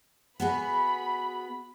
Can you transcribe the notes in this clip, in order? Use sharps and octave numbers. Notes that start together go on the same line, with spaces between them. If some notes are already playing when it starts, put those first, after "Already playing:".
B3 F#4 G#4 B5